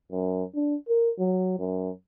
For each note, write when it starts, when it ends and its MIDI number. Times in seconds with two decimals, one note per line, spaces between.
0.12 0.43 42
0.55 0.76 62
0.89 1.10 70
1.19 1.56 54
1.59 1.90 42